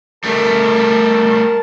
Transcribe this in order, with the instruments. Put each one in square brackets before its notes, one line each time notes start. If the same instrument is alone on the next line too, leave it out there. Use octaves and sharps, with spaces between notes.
[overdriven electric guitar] G3 A3 [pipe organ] A#4 A5